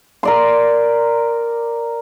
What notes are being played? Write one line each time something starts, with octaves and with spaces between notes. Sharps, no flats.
A#4 D5 C6